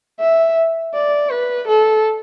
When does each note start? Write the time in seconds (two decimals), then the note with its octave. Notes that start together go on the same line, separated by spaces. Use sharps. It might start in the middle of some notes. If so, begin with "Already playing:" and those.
0.20 E5
0.94 D5
1.30 B4
1.67 A4